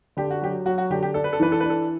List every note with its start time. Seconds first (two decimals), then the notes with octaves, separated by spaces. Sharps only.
0.17 D3 G4
0.31 F#4
0.42 F#3 G4
0.66 F#3 F#4
0.78 F#4
0.90 D3 G4
1.03 G4
1.14 D4 A4
1.24 B4
1.33 A4
1.40 E3 B4
1.52 A4
1.60 D4 B4
1.70 A4